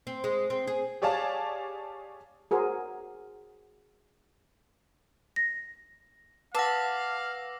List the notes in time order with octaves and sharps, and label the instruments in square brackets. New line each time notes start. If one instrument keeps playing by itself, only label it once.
[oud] C4
G#3
C4
G#4
[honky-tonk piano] G4 G#4 C#5 D5 F5 A5
[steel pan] F#4 G#4 A#4 C5
[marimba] A#6
[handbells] B4 F#5 [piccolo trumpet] F5 [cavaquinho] A5 [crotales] D6 E6 A#6